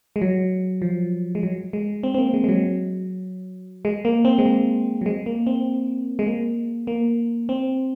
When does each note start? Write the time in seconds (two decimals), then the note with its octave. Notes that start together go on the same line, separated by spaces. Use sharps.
0.16 G#3
0.22 F#3
0.82 F3
1.35 G#3
1.43 F#3
1.73 G#3
2.03 C4
2.14 C4
2.18 A#3
2.34 G#3
2.44 G#3
2.49 F#3
3.85 G#3
4.05 A#3
4.25 C4
4.38 G#3
4.46 A#3
5.01 F#3
5.06 G#3
5.26 A#3
5.47 C4
6.19 G#3
6.27 A#3
6.87 A#3
7.49 C4